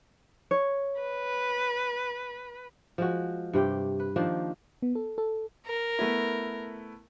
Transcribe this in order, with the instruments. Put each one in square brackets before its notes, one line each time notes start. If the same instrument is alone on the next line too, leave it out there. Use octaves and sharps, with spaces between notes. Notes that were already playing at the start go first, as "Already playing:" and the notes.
[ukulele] C#5
[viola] B4
[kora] F3 G#3 F#4
G2 C3 G4 G5
B4
D#3 F3 A#3 D4
[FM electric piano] B3
A4
A4
[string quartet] A#4
[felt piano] A3 B3 E4